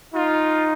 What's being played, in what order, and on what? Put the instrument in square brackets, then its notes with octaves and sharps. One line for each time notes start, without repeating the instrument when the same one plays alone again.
[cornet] D#4 [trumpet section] F4